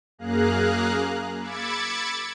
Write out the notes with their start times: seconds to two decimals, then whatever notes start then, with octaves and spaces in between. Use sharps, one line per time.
0.18 F#2 A#3 G#4 F5 A#5 F#6
1.40 B5 D6 E6 G#6 A6 C#7